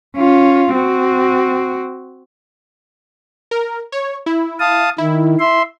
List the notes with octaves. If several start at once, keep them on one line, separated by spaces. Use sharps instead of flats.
C#4 F4
C4 F#4
A#4
C#5
E4
F5 A5 D#6
D#3 E4
E5 C6